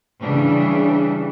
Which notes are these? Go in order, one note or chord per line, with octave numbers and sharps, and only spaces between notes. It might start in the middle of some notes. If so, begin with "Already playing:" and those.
C#3 E3 G3 D4